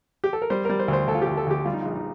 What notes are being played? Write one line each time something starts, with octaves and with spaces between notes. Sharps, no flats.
G4
A4
A#4
G3 C5
G3 A#4
C5
D2
C5
D2 A4
F4
D2 G4
A4
D2 G4
G3 F4
D#4
A#1 F4
D#4